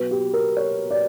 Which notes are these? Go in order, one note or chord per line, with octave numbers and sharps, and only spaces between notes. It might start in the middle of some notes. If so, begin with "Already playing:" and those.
Already playing: B2 F#3 B4
G4
A#4
C#5
D5